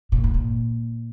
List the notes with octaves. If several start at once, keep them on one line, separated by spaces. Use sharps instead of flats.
A#2
G#2
A#2